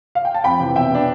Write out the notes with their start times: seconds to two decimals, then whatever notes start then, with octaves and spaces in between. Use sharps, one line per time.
0.15 F5
0.25 G5
0.34 A5
0.44 F2 G5 B5
0.60 C3 E3
0.76 B2 E5 G5
0.91 B3 D4